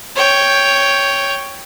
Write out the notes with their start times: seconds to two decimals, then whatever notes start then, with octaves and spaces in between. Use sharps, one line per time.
0.16 C#5 G5